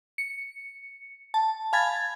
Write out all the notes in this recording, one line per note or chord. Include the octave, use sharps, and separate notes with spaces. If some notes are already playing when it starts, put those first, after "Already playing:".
C#7
A5
F5 G#5 B5 G#6 A6